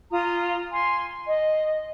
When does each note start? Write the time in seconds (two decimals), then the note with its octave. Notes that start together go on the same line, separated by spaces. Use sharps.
0.12 F4 A#5 D#6
0.72 G#5 C6
1.27 D#5